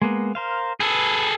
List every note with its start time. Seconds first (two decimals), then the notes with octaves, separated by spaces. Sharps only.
0.02 G#3 A#3 B3
0.35 A#4 C5 F5
0.80 G#4 A4 B4